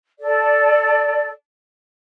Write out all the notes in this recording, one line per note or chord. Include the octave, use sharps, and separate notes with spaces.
A4 D5